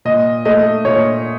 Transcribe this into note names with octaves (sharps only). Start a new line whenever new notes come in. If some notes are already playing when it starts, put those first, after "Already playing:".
A#2 D#5
A3 D#5
A#2 C#5